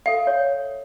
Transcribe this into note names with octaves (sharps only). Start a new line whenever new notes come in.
A4 E5 F5
C#5